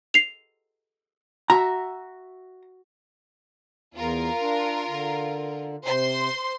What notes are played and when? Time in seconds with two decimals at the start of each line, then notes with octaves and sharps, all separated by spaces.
0.14 C7 F7
1.50 F#4 E5 A#5
3.95 E2 F4 A#4
4.41 D4
4.88 D3
5.85 C3 C5 C6